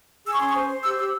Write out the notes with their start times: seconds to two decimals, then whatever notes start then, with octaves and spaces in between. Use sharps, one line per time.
0.25 G#4 E6
0.33 C#6
0.39 C#4 C6
0.48 C#6
0.54 C5
0.69 C5
0.84 G4 E6
0.98 G4 E6